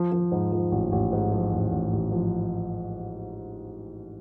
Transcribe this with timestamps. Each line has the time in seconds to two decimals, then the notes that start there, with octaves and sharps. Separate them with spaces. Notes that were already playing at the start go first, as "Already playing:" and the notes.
Already playing: F3
0.12 F3
0.32 G#2
0.52 F3
0.72 A1
0.92 A1
1.13 G#2
1.32 F3
1.53 A1
1.72 A1
1.93 A1
2.12 F3